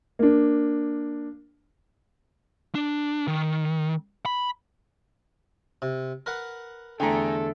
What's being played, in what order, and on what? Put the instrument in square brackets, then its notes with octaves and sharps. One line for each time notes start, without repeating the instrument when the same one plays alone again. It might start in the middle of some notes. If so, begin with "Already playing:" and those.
[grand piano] A#3 D4
[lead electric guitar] D4
D#3
B5
[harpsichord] C3
A#4 B4 F#5
[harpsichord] E2 [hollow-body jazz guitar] D3 A3 [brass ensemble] G#4 A4 [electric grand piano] G5 G#5 A#5